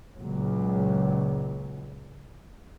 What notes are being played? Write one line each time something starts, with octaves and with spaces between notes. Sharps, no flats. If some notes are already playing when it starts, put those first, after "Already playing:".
C#2 A#2 F#3